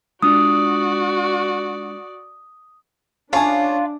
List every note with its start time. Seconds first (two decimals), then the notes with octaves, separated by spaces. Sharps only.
0.22 G#3 D4 F4 F#4 D5 D#6
3.33 C#3 D4 F4 C#5 G#5 A5 D#6